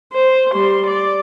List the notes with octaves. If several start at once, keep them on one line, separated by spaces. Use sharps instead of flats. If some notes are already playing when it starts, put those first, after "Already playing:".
C5
G3 C6
D5